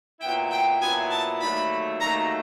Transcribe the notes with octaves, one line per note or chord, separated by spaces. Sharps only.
A#2 F#3 B3 E4 G5
G5
A#2 F#3 B3 E4 G#5
A5
D#2 D3 F#3 A3 B5
D#2 D3 F#3 A3 A#5